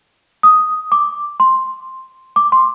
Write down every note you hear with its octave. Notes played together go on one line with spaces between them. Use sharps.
D#6
D6
C6
D6
C6